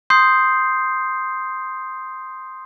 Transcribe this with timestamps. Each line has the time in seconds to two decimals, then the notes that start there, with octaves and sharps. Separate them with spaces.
0.10 C6 D#6 G6 C7